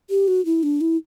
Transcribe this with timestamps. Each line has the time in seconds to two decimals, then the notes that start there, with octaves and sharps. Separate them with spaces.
0.10 G4
0.28 F#4
0.45 E4
0.63 D4
0.81 E4